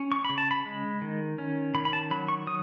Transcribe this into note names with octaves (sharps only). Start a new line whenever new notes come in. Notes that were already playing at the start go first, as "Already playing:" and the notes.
Already playing: C#4
C#6
C#3 B5
A5
B5
G#3
D#3
C#4
D#3 B5
B5
A5
F#3 B5
C#6
F#3 D#6